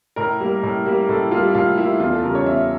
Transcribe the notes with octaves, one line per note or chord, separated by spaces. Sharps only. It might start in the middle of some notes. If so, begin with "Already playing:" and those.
A2 A#4
G3 A#3
A2
G3 A#3
A2 A4
G3 A#3 F4
A2 F4
G3 A#3 E4
E2 F4
A4
C#3 G3 A#4
C#5
E2 E5